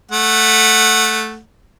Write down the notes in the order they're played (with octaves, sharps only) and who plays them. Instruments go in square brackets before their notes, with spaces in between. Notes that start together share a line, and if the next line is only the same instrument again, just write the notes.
[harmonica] A3 F#5